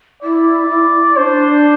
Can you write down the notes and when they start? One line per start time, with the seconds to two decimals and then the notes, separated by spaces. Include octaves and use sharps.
0.23 E4 D5
0.70 E4
1.17 D4 C5